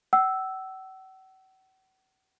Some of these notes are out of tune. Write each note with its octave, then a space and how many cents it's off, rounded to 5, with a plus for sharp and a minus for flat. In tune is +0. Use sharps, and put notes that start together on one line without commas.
F#5 +45 E6 +0